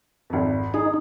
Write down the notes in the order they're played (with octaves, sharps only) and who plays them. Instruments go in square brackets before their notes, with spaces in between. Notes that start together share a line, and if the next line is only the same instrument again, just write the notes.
[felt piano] G#1 F2
[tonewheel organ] D#4 [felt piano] G#4